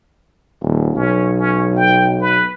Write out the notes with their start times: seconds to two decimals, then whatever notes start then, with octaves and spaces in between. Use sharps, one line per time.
0.62 D#1
0.96 B1 C#4
1.40 C#4
1.77 G5
2.21 B4